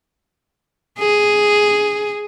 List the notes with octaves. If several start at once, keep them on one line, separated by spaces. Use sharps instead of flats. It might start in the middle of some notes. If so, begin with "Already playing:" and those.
G#4